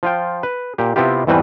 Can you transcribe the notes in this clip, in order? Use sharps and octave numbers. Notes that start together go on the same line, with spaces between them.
F3 F4 G5
B4
A#2 G4
C3 B3 C4 E4 F4 G4
E2 G#2 E3 G3 C4 B4